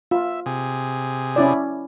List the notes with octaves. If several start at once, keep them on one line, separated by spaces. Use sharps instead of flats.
F4 E5
C3 G#4
C#4 E4 D5